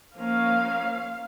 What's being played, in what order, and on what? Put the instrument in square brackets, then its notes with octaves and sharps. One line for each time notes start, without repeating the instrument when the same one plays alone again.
[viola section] F3 A#3 C#4 F5